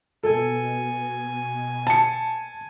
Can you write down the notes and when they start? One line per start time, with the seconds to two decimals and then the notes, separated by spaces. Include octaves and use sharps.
0.23 B2 A4 G#5
1.87 A5 C#7